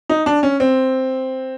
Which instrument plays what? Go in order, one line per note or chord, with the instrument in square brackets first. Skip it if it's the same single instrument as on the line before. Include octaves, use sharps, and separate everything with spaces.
[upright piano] D#4
D4
C#4
C4